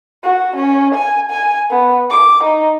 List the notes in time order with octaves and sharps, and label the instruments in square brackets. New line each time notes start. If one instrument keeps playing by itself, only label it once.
[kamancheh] F#4
C#4
G#5
G#5
B3
D6
D#4